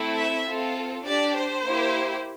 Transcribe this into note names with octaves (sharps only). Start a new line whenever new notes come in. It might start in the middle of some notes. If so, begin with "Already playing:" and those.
Already playing: A3 C4 E4 A4
E5
C4 F4 A4
D4 G4 D5
C5
A#3 E4 G4